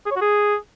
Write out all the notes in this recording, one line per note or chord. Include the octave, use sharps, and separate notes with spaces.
G#4
C#5
F#4
G#4